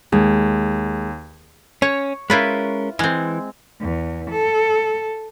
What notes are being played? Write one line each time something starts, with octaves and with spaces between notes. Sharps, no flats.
D#2 G#3
C#4 C#5
G#3 C#4 E4 F4 A#4 B4
E3 G#3 C4
E2
A4